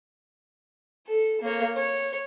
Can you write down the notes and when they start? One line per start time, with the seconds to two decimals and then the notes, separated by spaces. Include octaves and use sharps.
1.07 A4
1.41 A#3 C#5
1.76 C#5